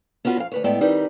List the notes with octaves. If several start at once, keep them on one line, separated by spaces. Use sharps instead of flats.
B3 C#4 F4 F#4 A#4 B4
F2 F5
D2 B4 C#5
A2 G#3 B3 A4 D5 G5
D#3 G3 C4 D#4 B4